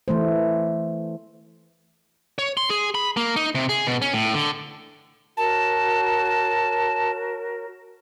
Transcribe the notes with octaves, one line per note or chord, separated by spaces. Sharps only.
E3 A3 C5
C#5
C6
G#4
B5
A#3
D#4
C3
G#4
B2
C#4
A2
D3
F#4 A#4 C#5 A5